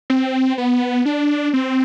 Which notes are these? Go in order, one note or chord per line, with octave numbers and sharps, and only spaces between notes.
C4
B3
D4
C4